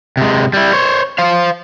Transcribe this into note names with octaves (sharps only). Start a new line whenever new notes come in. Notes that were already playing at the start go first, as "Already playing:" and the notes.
C3 G#3
G3 E4
C5 C#5
C5 F5